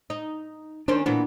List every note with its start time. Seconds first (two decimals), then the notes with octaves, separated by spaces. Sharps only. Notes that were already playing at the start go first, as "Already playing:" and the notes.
0.10 D#4
0.88 D#3 C#4 D4 C5
1.06 A#2 E3 B3 D4